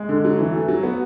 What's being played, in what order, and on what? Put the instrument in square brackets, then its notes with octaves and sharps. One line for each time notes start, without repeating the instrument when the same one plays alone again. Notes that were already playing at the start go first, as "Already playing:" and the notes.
Already playing: [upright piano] G#3
D3
F#3
E3
A3
F#3
B3